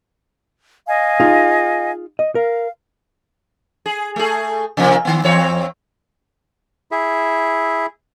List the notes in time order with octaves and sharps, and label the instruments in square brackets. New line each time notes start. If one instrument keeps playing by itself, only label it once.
[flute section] D#5 F5 G#5
[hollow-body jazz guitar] D#4 F4 G#4
D#5
[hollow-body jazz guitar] A#4 [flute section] F5
[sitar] G#4
A3 G#4
C3 F3 A#3
D#3 B3
E2 C4 C#5
[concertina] E4 G#4 E5